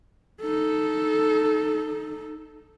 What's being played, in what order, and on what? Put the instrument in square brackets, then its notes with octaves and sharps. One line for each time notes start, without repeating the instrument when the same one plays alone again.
[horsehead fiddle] D#4 A4